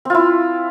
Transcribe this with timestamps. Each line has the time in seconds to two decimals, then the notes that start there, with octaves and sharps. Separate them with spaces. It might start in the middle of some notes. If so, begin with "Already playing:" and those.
0.05 C4
0.10 F4
0.14 E4